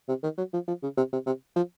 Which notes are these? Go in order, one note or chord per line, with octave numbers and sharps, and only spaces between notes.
C3
D#3
F#3
F3
F3
C#3
C3
C3
C3
F3